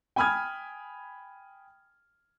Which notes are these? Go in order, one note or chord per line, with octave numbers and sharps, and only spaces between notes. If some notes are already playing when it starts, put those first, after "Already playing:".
G5 G#5 B5 D#6 F6 G#6